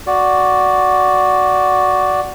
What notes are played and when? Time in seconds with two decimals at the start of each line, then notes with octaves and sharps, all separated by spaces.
0.07 F#4 D5